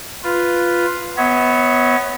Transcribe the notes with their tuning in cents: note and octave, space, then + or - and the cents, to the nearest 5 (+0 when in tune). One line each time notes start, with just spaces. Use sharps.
F4 +0 B4 +0
B3 +10 C#5 +0 E5 -40